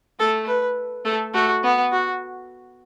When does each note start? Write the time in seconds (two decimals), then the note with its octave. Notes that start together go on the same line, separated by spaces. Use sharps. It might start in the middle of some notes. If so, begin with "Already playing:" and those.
0.20 A3 A4
0.47 B4
1.05 A3 A4
1.34 A3 F#4
1.63 B3
1.92 F#4